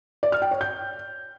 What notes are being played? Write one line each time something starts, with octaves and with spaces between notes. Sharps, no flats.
D5
F6
G5
C#5
G6